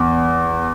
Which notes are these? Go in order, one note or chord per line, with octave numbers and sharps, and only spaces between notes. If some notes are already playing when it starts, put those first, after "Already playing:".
Already playing: E2